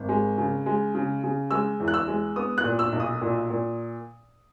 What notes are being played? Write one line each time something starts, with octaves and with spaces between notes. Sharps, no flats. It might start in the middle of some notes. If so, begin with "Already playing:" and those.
Already playing: G#1
G#3
C#3
G#3
C#3
C#3
G#3 E6
E2
F#6
E6
G#3
B3 D#6
F#6
A#2
E6
B1
D#6
A#2
A#2